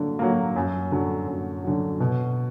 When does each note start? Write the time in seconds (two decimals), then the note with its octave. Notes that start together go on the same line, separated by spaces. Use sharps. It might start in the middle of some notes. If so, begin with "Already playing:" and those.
Already playing: D3 F#3 A#3
0.19 F#3 A#3
0.56 F#2
0.92 D3 F#3
1.27 F#2
1.64 D3 F#3
2.00 B2